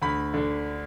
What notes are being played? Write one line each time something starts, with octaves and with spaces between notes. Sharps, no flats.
D2 B5
D3